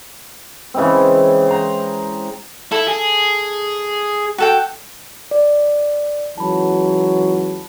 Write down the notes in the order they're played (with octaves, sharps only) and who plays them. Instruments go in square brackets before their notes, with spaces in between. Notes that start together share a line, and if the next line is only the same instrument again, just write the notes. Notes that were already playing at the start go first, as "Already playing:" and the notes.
[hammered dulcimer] C#3 E3 G#3 C4
C5 A#5
[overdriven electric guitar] E4 [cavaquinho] A4
[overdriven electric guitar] G#4
[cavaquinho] F#4 A4 G5
[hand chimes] D5
[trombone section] C#2 E3 F#3 [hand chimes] A5 B5